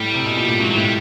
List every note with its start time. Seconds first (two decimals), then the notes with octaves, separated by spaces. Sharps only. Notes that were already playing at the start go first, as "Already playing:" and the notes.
Already playing: A2 G3
0.14 C3
0.26 B2
0.37 A#2
0.48 A2
0.59 G#2 F#3
0.71 F#3
0.76 A2 G3